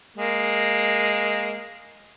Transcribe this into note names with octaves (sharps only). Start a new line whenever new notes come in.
G#3 A#3